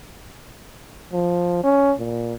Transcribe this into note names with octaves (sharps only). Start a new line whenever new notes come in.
F3
C#4
A#2